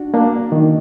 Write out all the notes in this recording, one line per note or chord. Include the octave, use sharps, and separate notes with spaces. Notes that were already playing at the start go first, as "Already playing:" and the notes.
Already playing: D4 F#4
A#3 D4
D#3